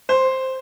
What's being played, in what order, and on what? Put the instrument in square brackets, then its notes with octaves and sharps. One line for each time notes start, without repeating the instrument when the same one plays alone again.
[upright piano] C5